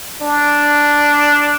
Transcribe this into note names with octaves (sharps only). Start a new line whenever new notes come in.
D4